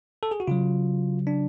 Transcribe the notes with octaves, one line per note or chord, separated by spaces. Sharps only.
A4
G#4
F#4
C#3 F#3 F4
D4